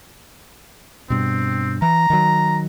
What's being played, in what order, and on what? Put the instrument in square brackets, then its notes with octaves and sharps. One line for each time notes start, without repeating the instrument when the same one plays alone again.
[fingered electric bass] G2 B2 [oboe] C4
[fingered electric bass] E3 [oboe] A#5
[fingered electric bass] D#3 F#3